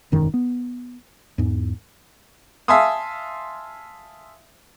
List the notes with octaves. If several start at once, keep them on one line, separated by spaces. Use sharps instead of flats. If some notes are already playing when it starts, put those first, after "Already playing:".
E1 F#2 D#3
B3
E2 G#2
E5 F5 G#5 A5 C6 D#6